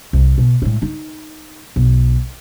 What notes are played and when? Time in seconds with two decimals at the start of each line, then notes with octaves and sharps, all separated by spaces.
0.13 C2
0.38 B2
0.62 A2 G#3
0.82 D#4
1.76 B1